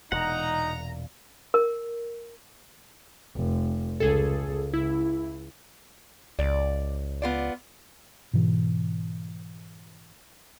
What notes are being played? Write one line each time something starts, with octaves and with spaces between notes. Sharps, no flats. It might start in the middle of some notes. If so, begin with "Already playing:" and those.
E1 A#2 D#4 F#5 A#5
A#4
F1
C#2 G#4 A4
C#2 E4
C#2 D5
B3 F4 D5
G#2 B2 E3